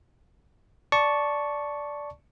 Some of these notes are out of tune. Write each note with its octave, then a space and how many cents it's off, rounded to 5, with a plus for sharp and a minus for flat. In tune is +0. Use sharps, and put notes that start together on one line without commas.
D5 -5 A5 -5 C#6 +0